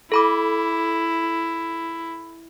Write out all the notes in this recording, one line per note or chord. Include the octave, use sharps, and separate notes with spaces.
E4 A4 B5 D6